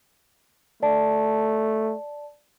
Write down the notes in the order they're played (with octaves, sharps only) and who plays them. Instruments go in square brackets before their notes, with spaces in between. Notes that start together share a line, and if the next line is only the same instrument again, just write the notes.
[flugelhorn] A3 [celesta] D5 A5